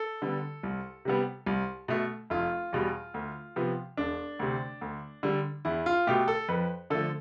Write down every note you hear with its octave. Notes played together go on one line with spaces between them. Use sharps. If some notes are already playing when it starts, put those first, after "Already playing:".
Already playing: A4
D3 G3 B3
C2
C3 G3 B3
C2
B2 A3
F1 F4
E2 B2 G3
D2
C3 F3 B3
E1 D4
D2 C3
D2
D3 G3
E2 E4
F4
B2 A3 G4
A4
F2 B4
D3 F3 A3 A4